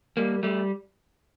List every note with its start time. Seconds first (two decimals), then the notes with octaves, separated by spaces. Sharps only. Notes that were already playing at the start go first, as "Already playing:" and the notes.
0.17 G3 A#3
0.43 G3 A3